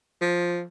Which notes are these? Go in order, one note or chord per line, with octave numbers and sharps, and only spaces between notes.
F3